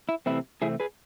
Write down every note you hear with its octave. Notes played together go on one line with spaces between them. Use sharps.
E4
C3 E3 A3 C4 E4
C3 E3 A3 C4 E4 G#4
G#4 B4